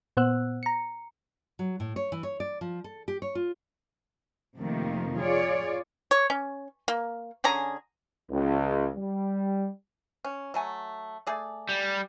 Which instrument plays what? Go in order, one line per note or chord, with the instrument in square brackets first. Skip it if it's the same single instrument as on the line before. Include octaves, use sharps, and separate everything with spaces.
[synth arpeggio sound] A#2 B3 C5 F#5 E6 F#6
A#5 C#7
[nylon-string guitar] F#3
A2
C#5
E3
C#5
D5
F3
A4
G4
C#5
F4
[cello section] F2 C3 D#3 F3 A3 A#3
F4 G#4 C#5 D5
[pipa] C#5
C#4
A#3
D3 C#4 G#4 A#5
[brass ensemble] C#2
G3
[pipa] C#4
F#3 A3 G#5
A3 G#4 D5
[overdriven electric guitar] G3